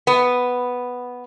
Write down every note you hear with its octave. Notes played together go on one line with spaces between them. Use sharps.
B3